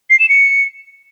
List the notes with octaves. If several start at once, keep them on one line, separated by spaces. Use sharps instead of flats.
C7
E7
C#7